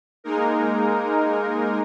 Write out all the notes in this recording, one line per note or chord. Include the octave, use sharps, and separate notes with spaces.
G#3 A#3 D#4 A#4